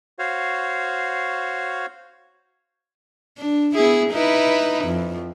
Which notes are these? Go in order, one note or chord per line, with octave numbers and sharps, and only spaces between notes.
F#4 C5 C#5 F5
D4
B3 E4 G#4
D#4 E4 B4
F2